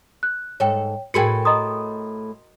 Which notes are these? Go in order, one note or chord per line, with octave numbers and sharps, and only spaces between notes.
F#6
G#2 A4 C#5 G5
A2 F#4 G#4 A#4 B4 G5 C#7
D#5 A#5 C6 D#6